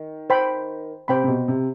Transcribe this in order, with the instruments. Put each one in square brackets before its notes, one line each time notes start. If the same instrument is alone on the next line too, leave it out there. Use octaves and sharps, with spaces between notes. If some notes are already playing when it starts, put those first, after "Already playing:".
Already playing: [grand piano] D#3
[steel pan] C5 G5 B5
[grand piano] C3 [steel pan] C5 G5 B5
[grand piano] C3
B2
C3